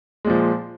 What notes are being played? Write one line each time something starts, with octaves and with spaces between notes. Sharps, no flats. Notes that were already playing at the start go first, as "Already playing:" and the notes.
A#2 F3 G#3